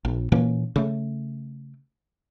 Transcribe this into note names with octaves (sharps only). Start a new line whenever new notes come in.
A#1
A#2 E3 A#3 C#4
C#3 A3